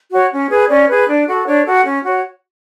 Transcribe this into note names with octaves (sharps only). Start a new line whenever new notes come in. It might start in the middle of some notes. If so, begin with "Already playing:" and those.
F#4 C#5
C#4
G#4 B4
C#4 D5
G#4 B4
D4
F#4 A4
D4 C#5
F#4 A4
C#4
F#4 C#5